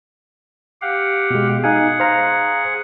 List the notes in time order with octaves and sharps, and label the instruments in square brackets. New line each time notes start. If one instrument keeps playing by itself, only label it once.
[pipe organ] G4 F5 F#5
[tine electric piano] B2 G#3
[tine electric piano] D#4 F5 G#5 [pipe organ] G#4 F#5
[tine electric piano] C5 F5 A#5